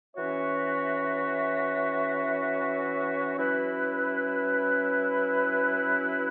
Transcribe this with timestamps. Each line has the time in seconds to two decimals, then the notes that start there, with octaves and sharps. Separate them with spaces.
0.14 E3 C#4 F#4 C#5 E5
3.36 F#3 C#4 E4 B4